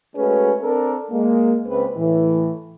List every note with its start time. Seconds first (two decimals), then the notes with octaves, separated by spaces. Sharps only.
0.16 G#3 A3 C#4 F#4 G#4 B4
0.61 C4 D4 A4 A#4
1.11 G#3 A#3
1.67 C#2 C4 B4
1.97 A2 E3